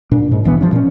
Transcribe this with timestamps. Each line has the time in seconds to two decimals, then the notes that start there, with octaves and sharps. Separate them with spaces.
0.12 A#2 D4
0.31 G#2
0.44 E1 A#1 E3 B3
0.61 G2 F3 C#4
0.72 A#2 C#4